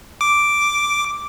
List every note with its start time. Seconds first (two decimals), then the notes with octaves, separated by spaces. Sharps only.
0.21 D6